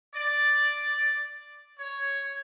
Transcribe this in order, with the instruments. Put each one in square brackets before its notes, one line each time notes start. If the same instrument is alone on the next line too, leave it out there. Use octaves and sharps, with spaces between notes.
[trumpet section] D5
C#5